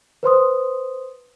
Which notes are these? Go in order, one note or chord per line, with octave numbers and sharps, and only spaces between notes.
B4 C5 C6 D#6